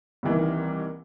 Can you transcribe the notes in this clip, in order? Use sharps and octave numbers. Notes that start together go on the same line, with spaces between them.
C2 D#3 E3 A#3